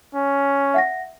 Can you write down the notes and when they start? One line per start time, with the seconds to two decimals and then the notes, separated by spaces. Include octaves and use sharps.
0.14 C#4
0.74 E5 F#5 A#6